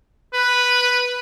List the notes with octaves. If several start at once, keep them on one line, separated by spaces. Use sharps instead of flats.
B4